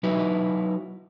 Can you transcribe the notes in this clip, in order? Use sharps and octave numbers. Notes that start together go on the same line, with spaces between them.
F#3 D#4 E4 F#4 B4